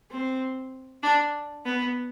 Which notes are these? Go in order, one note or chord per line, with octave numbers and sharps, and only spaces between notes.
C4
D4
B3